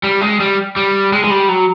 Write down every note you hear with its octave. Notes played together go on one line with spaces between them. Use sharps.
G3
G#3
G3
G3
G#3
G#3
G3
F#3